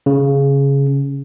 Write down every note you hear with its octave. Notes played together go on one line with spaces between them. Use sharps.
C#3